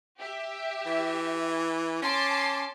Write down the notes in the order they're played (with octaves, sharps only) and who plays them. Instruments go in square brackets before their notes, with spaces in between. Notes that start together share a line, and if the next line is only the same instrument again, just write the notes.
[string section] G4 E5
[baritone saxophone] E3
[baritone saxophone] C#4 [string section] A5 C6 D6